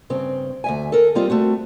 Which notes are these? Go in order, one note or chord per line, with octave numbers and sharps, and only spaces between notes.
G2 C#3 C4
D2 E5 G#5
A4 A#4
G3 C4 F4 G4 D#5
A3 C4 F#4